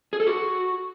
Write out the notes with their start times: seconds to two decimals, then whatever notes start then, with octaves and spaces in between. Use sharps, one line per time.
0.13 G#4
0.20 A4
0.27 F#4